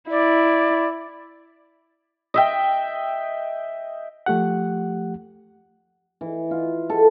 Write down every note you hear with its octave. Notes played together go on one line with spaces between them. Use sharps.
E4 D5
D#5 E5 G5
F3 A3 G4 F#5
E3
F4
A4